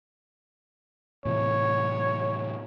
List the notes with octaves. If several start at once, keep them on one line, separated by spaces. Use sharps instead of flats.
A2 C3 E3 C#5